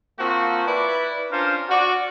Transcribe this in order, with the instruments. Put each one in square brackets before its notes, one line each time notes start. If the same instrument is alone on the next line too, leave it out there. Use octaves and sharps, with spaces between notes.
[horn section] F3 A#3 C4 F4 F#4
E4 B4 D5
C#4 D4 F4 A#4 C5
F#4 D5